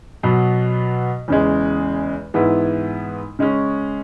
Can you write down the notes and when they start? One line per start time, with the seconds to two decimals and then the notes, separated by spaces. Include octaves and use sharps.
0.23 B2 F#3 B3
1.28 E2 C#3 G#3
2.34 G#2 E3 B3 E4
3.39 C#3 G#3 C#4